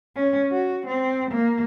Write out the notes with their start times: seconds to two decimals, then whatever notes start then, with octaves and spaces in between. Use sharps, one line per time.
0.16 C#4
0.52 F#4
0.87 C4
1.31 A#3